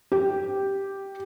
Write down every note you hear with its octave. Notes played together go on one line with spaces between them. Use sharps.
G4